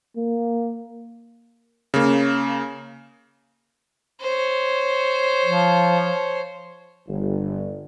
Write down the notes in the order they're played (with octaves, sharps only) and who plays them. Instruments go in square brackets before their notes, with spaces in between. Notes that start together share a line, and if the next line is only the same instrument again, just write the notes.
[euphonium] A#3
[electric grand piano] C#3 A#3
[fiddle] C5 C#5
[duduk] F3
[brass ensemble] G1